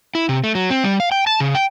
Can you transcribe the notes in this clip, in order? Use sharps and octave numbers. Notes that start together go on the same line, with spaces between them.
E4
C3
A3
F#3
C4
G3
F5
G5
A5
C#3
G5